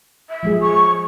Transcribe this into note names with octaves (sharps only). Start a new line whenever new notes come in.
E5
F3 G#3 G#4
C#6